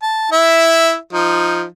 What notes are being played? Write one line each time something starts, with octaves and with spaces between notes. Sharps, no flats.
A5
E4 E5
F3 D#4